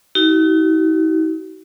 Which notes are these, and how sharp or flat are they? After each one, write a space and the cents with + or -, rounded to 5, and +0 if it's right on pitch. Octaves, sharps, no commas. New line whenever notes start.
D#4 +40 F#4 +40